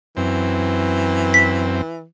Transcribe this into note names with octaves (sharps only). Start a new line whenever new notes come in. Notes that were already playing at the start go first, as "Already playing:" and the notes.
F#2 E3 C4
B6